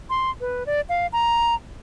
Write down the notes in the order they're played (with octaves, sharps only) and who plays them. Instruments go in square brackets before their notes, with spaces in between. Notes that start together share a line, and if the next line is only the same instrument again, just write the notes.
[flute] C6
B4
D5
F5
A#5